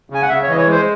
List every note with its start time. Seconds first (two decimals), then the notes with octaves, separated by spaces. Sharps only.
0.10 C#3 G#5
0.22 F#5
0.29 C#3 E5
0.43 C#5
0.48 E3 D#5
0.57 C#5
0.67 G#3 C5